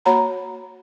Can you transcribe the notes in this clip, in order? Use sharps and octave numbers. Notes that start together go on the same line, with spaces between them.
A#3 F#4 C#5 F#5 A#5 B5